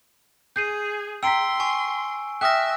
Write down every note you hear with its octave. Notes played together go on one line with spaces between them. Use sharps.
G#4 G6 C7 D#7
G5 A#5 C6 E6 B6 D7
G#5 C#6
E5 G5 D#6 F6 F#6 A#6